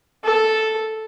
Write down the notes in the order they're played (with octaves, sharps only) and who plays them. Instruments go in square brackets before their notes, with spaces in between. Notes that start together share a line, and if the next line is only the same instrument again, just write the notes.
[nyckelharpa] A4